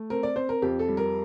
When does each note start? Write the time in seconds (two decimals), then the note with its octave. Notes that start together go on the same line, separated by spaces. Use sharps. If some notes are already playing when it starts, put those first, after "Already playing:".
Already playing: A3
0.10 C4 A#4
0.23 D5
0.36 C4 C5
0.49 A#4
0.62 F2 G4
0.79 A4
0.88 G3
0.97 A#4